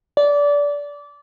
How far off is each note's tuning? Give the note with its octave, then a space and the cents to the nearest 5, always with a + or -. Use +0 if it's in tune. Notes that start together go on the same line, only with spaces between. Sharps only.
D5 -20